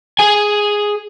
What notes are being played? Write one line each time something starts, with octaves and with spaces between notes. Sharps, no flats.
G#4 G#5